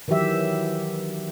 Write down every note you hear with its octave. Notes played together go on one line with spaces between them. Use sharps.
D#3 E3 F#3 G4 E5